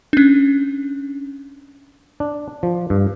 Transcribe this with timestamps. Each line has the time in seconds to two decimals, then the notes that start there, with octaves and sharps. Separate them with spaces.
0.13 C#4 D4
2.20 D4
2.63 F3
2.90 G2